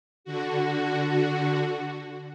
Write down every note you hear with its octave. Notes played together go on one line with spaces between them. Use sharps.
D3 F#4